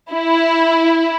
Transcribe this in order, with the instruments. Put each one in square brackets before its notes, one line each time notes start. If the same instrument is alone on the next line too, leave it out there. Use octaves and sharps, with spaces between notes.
[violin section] E4